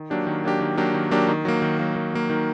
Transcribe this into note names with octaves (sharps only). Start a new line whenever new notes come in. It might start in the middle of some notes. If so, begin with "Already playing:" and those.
Already playing: D#3
F#3 A#3 D4 G4
D#3
F#3 A#3 D4 G4
D#3
F#3 A#3 D4 G4
D#3
F#3 A#3 D4 G4
D#3
F#3 A#3
D#3
F#3 A#3
D#3
F#3 A#3
D#3